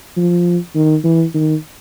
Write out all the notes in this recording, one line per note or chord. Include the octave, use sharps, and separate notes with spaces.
F3
D#3
E3
D#3